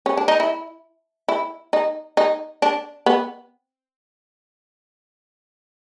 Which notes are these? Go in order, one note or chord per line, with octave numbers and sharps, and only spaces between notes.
C#4
D4
D#4
E4
E4
D#4
D#4
D4
B3